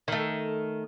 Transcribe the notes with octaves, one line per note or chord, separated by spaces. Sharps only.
D#3 A3